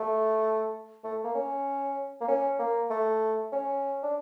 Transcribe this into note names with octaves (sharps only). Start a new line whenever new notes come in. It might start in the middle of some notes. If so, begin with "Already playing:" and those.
Already playing: A3
A3
A#3
C#4
A#3
C#4
A#3
A3
C#4
D4